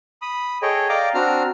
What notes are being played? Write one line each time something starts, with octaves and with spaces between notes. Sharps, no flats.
B5 D#6
G#4 A4 C#5 D#5 G5
D5 D#5 F5 G5 A#5 D6
C4 D4 F#4 A#5 F6